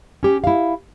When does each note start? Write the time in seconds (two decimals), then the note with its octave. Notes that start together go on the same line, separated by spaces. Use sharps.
0.23 C#4 G4
0.44 E4 F5